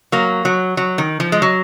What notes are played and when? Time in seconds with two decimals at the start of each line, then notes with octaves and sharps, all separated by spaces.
0.12 F#3 A#3
0.45 F#3
0.77 F#3
0.98 D#3
1.20 F3
1.32 G#3
1.42 F#3